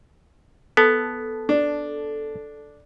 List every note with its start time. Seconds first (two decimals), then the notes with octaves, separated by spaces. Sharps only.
0.77 B3 A4
1.49 D4